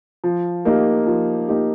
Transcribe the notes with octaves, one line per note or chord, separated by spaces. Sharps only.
F3
A#3 D#4 G4
F3
A#3 D#4 G4